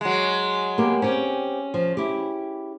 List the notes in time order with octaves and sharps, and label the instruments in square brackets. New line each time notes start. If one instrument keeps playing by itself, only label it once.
[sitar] F#3 G#3
[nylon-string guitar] A#3 B3 G4
[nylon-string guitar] C4 G4 [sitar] C#4
[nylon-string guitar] F3
E4 G4